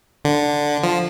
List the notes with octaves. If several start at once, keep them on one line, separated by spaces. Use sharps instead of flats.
D3
F3